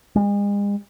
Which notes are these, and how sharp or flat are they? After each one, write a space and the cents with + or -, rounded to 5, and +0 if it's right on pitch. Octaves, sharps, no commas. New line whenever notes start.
G#3 -40